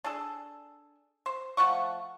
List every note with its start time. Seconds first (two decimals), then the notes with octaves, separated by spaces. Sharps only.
0.04 D4 G#4 A4
1.26 C5
1.57 F3 A3 F#5 C#6